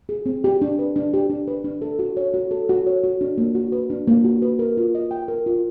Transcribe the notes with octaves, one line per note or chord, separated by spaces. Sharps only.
G#4
C4
G4
D4
B4
D4
G4
D4
B4
D4
A4
F#4
C#5
F#4
A4
F#4
C#5
F#4
D4
A#3
F#4
B4
D4
A#3
F#4
B4
A#4
F4
D#5
G5
A#4
F4